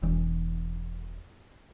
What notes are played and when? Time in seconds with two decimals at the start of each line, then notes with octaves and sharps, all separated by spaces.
0.03 E1 E3